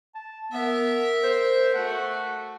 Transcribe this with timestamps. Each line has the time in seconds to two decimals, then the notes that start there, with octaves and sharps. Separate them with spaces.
0.15 A5
0.52 B3 A#4 E5
1.24 C5
1.75 A3 F#4 F#5